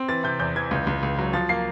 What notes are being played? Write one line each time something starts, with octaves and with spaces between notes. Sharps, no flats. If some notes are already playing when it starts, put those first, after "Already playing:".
Already playing: C4
E3 A6
C3 G6
E2 G6
E3 G#6
C#2
C#2
C#2
F#3
F3 A6
A#3 C7